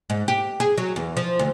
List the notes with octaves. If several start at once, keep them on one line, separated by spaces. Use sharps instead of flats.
G#2
G4
G#4
F#3
E2
F3
D2